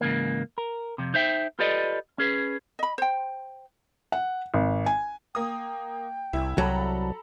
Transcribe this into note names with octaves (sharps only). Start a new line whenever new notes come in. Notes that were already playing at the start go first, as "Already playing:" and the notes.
G#2 C#3 E3 A#3
A#4
F2 C3
D#4 C5 E5 G5
F4 G4 A4 B4 D5 D#5
C#4 G#4 B4
D#5 B5
C5 G5
F#5
G#1
G#5
A#3 G5 D#6
C2 E4
C2 F#3 A4 A#5 B5